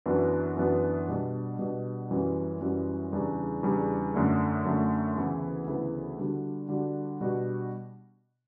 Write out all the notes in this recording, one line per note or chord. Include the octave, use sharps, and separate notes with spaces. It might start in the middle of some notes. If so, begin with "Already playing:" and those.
F#2 E3 B3 D4 F#4
F#2 E3 B3 D4 F#4
B2 G3 D4
B2 G3 D4
F#2 E3 G3 C#4 F#4
F#2 E3 G3 C#4 F#4
E2 C#3 G3 D4
E2 C#3 G3 D4
F#2 D3 A3
F#2 D3 A3
D2 C#3 E3 B3 E4
D2 C#3 E3 B3 E4
D3 G3 D4 F#4
D3 G3 D4 F#4
B2 G3 D4 F#4